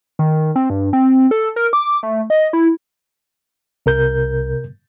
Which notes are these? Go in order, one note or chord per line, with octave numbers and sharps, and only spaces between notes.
D#3
C4
G2
C4
A4
A#4
D6
A3
D#5
E4
C2 C3 A#4 G6